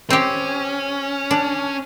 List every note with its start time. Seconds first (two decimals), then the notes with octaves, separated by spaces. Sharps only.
0.10 C4 C#4 G4
1.31 D4